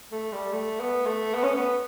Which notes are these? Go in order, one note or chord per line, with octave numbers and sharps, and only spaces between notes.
A3
G3
A3
B3
A3
B3
C#4
B3